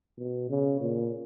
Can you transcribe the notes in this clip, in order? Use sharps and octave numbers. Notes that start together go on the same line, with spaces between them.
B2
C#3
A#2